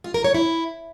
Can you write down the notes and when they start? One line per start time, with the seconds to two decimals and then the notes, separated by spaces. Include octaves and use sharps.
0.04 F4
0.14 A#4
0.24 C#5
0.34 E4